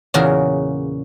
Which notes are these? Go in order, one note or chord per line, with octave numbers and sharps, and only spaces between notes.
E2 A#2 C#3 F#4 A#4